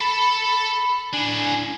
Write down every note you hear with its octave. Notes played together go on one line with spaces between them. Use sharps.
A4 A5 B5
A2 D4 G#5